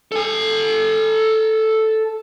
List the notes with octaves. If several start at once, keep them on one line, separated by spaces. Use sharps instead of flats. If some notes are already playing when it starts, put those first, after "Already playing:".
A4 G#5